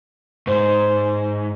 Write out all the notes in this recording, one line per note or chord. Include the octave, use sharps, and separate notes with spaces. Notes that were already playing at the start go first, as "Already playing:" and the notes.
G#2 C5